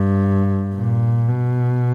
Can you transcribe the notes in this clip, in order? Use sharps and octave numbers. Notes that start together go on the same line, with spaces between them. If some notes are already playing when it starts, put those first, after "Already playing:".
Already playing: G2
A#2
B2